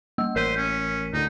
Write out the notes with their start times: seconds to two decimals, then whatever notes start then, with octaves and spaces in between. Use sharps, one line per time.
0.18 G3 A#3 E6
0.36 A1 A#4 C5 B6 D#7
0.57 C#4
1.14 D2 A2 D3 D#4